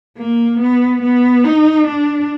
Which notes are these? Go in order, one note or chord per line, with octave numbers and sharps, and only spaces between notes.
A#3
B3
B3
D#4
D4